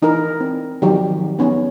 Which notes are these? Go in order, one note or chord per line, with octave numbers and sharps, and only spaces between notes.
E3 D#4 E4 A#4
C4
D#3 F3 F#3 G4
B3 C#4 D#4